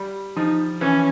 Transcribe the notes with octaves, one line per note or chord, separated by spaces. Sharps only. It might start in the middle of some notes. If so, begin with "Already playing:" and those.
Already playing: G3
F3 D#4
E3 C#4